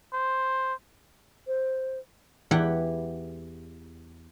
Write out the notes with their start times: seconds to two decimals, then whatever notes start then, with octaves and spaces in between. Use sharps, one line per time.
0.13 C5
1.47 C5
2.51 E2 E4 G4 F#5 G5